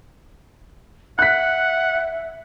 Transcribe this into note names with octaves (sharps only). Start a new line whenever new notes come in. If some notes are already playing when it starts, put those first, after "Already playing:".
E5 F#5 F#6 B6